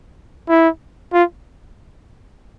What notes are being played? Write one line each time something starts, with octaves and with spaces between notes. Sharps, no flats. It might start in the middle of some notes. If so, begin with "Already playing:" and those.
E4
F4